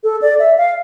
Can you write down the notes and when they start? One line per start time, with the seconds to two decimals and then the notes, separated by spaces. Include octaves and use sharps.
0.04 A4
0.22 D5
0.39 E5
0.58 F5